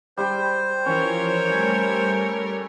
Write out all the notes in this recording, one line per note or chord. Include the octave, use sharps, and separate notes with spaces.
G3 C5 G5
E3 F3 C#4 A#4 C#5
G3 A3 G#5